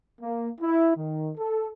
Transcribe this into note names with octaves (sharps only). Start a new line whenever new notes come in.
A#3
E4
D#3
A4